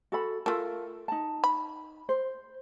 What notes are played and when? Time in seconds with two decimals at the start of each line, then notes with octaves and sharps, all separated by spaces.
0.12 F#4 A4 B5
0.46 A3 F4 A4 A#4
1.08 D#4 A5
1.44 B5
2.09 C5